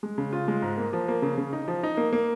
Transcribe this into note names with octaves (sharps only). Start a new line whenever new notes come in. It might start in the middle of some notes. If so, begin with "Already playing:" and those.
G#3
C#3
F4
G#3
G#2
A#3
F3
A#3
C#3
C#3
D#4
F3
D#4
A#3
A#3